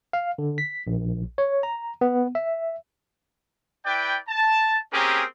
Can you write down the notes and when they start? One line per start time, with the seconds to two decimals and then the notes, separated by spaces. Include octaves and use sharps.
0.13 F5
0.38 D3
0.58 B6
0.87 A#1
1.38 C#5
1.63 A#5
2.01 B3
2.35 E5
3.85 E4 B4 D5 G5
4.29 A5
4.92 A#3 C4 C#4 G4 G#4 A#4